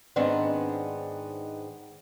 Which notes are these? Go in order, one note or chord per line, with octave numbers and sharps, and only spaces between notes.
G#2 D#3 B3 C4 D4 F#5